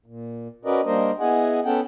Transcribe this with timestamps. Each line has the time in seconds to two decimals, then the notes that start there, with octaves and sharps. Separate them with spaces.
0.06 A#2
0.65 C#4 F#4 A#4 B4 D5 D#5
0.85 G3 A#3 D4 A#4 C5 D#5
1.20 B3 E4 G#4 D#5 F#5 G#5
1.65 B3 C#4 A4 F#5 G5